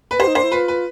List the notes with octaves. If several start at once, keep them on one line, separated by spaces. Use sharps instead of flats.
B4
G4 C5
D#4
D4 C5
E4
F4 B4
B4